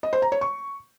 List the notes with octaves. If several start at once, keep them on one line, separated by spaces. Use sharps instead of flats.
D#5
C5
A#5
C#5
C#6